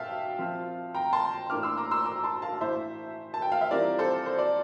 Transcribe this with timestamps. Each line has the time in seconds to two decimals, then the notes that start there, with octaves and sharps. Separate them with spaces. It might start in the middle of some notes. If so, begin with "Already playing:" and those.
Already playing: A#2 E5 F5 G5 A5
0.39 F3 C4 F4
0.95 G5 A#5
1.13 A5 C6
1.50 A2 E3 A#3 D4 D6 F6
1.63 C6 E6
1.78 A#5 D6
1.91 C6 E6
2.05 A#5 D6
2.24 A5 C6
2.42 F5 A5
2.60 A2 E3 A3 C5 E5
3.34 A5
3.42 G5
3.52 F5
3.61 E5
3.71 E3 G3 C4 F4 A#4 D5
3.99 A4 C5
4.26 C5
4.38 D5